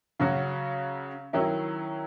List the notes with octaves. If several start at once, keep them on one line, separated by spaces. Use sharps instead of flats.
C#3 F#3 C#4 F#4
D#3 F#3 C#4 E4